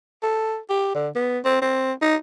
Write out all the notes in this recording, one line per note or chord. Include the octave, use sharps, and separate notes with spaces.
A4
G4
D3
B3
C4
C4
D#4